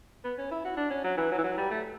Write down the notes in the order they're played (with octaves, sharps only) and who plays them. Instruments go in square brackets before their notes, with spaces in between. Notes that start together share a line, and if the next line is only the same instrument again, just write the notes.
[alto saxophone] B3
C#4
E4
F#4
D4
C#4
F#3
E3
F#3
E3
F#3
G3
A3